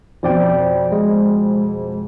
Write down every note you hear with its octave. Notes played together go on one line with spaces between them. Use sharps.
F2 B2 C5 D5 G5
G#3